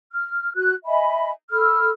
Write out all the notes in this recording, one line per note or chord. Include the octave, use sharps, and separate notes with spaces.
F6
F#4 F#6
D#5 E5 G#5 B5
A4 B5 E6 F6